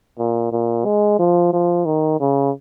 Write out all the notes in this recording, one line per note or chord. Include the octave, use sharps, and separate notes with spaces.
A#2
A#2
G#3
F3
F3
D#3
C#3